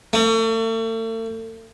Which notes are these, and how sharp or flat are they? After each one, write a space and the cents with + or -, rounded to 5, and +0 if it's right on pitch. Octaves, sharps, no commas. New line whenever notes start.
A3 +40